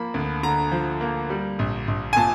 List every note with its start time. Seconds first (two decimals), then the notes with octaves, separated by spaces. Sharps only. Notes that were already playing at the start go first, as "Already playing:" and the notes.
Already playing: F3 A#3 B5
0.14 D2
0.43 D3 A#5
0.72 F3
1.01 A#3
1.30 G3
1.59 A#1
1.88 A#1
2.13 G#5
2.17 A#2 A5